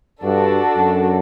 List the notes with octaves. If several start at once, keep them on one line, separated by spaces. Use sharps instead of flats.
G2 D4 F#4 A4
F#2